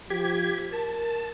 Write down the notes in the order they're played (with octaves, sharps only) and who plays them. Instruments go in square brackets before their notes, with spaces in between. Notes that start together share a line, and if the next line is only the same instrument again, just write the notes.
[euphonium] F3 [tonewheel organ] G4 G#6
[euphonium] A#4 [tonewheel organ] A5